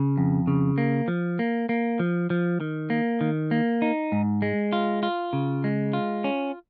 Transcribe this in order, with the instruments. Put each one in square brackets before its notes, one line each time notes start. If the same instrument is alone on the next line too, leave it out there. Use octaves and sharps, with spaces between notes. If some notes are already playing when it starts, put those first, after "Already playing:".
Already playing: [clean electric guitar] C#3
F2
C#3
A#3
F3
A#3
A#3
F3
F3
D#3
A#3
D#3
A#3
D#4
G#2
G#3
F4
F4
C#3
G#3
F4
C#4